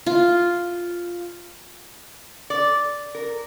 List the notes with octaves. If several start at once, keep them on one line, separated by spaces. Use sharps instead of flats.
F4
D5
A#4